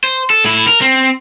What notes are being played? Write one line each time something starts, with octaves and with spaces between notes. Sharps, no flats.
C5
A4
A2 E4
A#4
C4